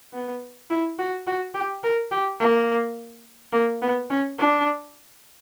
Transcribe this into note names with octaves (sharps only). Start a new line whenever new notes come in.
B3
E4
F#4
F#4
G4
A#4
G4
A#3
A#3
B3
C#4
D4